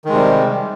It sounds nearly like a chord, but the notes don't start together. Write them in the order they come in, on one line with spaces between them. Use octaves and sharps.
D#3 G#3 C3 G3